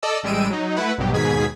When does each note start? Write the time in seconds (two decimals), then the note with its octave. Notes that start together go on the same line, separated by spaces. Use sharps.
0.03 A4 D5 D#5 A5 E6
0.23 A1 G3 G#3 E6 D7 D#7
0.50 F#3 D#4
0.76 A3 E4 B4 F#5
0.98 A#1 G2 B2 F#3 G4
1.12 D#2 G#2 B2 G#4 G#6 B6